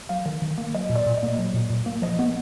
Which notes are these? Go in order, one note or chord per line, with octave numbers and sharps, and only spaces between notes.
F#3 F5
D#3
D#3
A#3
F#3 D#5
A#2
D5
A#2
D#5
A#3
F#3
A#2
A#2
A#3
F3 D#5
B3